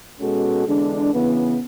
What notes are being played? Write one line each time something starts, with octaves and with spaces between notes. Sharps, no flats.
B2 G#3 C#4 F#4 A4
E2 D3 G#3 D4
C#3 E3 B3